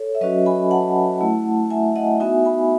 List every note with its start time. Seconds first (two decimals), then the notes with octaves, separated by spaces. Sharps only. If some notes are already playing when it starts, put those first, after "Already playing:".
Already playing: A4 C#5
0.15 E5
0.21 F#3 C#4 F#4 B4 D#5
0.46 G#5 B5
0.71 F#5 A5
1.21 A3 E4
1.70 E5 G#5
1.96 D#5 F#5
2.20 B3 D#4 F#4 E5 G#5
2.45 G#5 B5